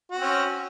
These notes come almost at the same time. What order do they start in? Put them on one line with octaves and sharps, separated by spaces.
F#4 C4 C#4